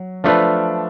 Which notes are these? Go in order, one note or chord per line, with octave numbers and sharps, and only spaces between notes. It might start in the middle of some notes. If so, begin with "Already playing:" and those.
Already playing: F#3
F3 A3 D4 F4 B4